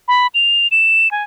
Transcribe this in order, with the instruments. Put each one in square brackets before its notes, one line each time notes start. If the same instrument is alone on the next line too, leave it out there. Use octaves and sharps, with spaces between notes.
[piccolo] B5
F7
E7
G#5